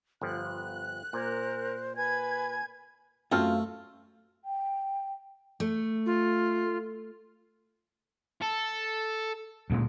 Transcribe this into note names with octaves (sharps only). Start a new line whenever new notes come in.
G1 F3 F#6
A#2 A#4 C5
B4 G#5 G#6
F#2 A3 C4 F4 F#4 A4 F5 E6
G5
A3
F4
A4
D2 A#2 G#3